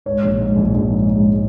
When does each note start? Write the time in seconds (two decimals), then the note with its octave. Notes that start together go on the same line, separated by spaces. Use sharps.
0.06 G#2 C#5
0.23 A#1
0.40 G#2
0.56 A#1
0.74 A#1
0.90 G#2
1.08 G#2